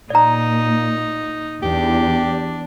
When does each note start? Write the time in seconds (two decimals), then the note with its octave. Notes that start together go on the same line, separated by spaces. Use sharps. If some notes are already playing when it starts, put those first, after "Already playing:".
0.10 A#2 D#4 D5 A#5
1.62 E2 D4 G4